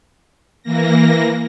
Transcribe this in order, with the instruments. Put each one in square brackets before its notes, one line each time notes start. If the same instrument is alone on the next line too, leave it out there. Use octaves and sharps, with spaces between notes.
[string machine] E3 A#3 A#6